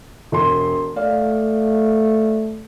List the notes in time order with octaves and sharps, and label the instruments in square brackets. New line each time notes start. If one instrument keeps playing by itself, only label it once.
[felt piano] E1 C6
[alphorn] A3 [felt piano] D5 F5